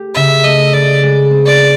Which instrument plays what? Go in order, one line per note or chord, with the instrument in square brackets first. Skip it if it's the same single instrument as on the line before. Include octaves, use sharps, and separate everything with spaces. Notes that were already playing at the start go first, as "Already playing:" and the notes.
Already playing: [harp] A3 G4
[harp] C#3 [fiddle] E5
[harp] A3 [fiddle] D#5
[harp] C#3 [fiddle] D5
[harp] G#3
C4
[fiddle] D5
[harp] C4